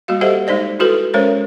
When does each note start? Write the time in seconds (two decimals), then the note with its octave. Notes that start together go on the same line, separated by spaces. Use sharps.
0.08 G3 A#3 F#4 F5
0.21 G4 A4 C5 D#5 E5 F#5
0.47 G#3 D#4 C5 D5 D#5
0.79 E4 F#4 A4 B4
1.14 G#3 C#4 A#4 C5 C#5